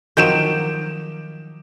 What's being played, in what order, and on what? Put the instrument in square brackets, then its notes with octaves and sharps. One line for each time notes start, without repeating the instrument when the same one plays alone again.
[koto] D#3 F3 F#3 [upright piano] G6 D7 E7